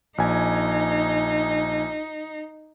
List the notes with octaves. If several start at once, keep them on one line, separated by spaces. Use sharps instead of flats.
A#1 D#4 G#5